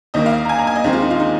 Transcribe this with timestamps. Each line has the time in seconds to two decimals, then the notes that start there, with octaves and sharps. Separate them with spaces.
0.14 D#2 D#3 A#3 D#5
0.26 F5
0.45 A#5
0.49 G#5
0.59 A#5
0.67 G#5
0.75 D#5
0.84 D#2 D#3 G#3 C4 G#4
0.93 F4
1.02 D#4
1.11 F4
1.20 D#4